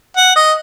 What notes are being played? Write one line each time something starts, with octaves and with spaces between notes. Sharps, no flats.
F#5
D#5